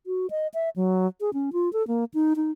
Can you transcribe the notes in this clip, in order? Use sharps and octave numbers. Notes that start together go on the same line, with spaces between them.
F#4
D#5
E5
F#3
G#4
C#4
F4
A4
A#3
D#4
D#4